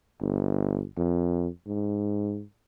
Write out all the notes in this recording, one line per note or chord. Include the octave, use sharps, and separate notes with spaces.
G1
F2
G#2